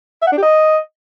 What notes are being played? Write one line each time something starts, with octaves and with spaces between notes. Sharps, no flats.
E5
F#5
D4
G4
D#5